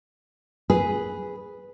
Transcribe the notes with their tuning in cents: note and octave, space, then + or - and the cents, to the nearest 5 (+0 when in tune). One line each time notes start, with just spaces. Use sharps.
G#4 +0 B4 +0